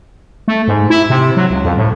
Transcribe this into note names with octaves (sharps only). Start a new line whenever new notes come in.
A3
G#2
E4
C3
F#3
C#2
F2
A2